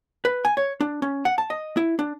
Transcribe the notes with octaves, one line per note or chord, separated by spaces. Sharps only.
B4
G#5
C#5
D4
C#4
F#5
A5
D#5
E4
D4